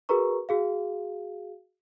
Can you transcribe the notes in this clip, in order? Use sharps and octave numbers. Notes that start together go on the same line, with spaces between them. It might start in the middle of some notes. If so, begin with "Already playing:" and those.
F#4 G#4 A#4 B4 A#5 C#6
F#4 G#4 F5